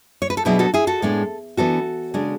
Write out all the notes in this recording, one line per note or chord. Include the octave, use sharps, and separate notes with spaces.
C#5
B4
A4
B2 F#3 B3 D4 E4 G#4
F#4 A4
E4 G#4
F#4 A4
A2 G#3 B3 D4
E3 B3 D4 F#4 A4
C#3 G#3 D4